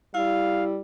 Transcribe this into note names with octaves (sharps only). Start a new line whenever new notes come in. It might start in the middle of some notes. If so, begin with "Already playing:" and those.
G3 E4 F5